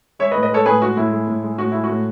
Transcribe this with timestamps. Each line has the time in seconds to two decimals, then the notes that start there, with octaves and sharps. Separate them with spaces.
0.19 G#3 C#5 E5
0.31 B4 D#5
0.35 A2
0.43 B4 D#5
0.51 G#3 A4 C#5
0.66 A2 G#4 B4
0.82 G#3 F#4
0.97 A2 E4
1.12 G#3
1.27 A2
1.43 G#3
1.58 A2 F#4
1.71 G#3 E4
1.84 F#4
1.90 A2